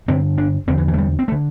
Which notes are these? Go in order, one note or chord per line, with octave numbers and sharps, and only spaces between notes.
G2 D3 C4
D4
E2 D3 C4
E3
E3
A3
G3
C4
A3
D3